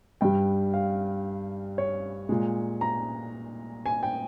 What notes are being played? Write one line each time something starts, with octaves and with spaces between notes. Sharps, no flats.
G2 G3 G5
F5
C#5
A#2 G#3
A#5
G#5
G5